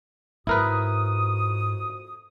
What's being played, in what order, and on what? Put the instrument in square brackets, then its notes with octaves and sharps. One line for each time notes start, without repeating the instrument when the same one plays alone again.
[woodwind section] F2 F#4 D#6 [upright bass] G#2 [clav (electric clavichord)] E4 A#4 B4